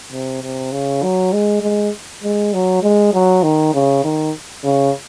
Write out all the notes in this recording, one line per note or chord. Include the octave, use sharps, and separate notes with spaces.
C3
C3
C#3
F#3
G#3
G#3
G#3
F#3
G#3
F#3
D#3
C#3
D#3
C#3